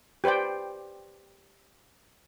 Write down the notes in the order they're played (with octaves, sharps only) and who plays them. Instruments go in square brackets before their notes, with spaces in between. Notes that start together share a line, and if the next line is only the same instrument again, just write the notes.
[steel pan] G4 B4 C5 D5 G5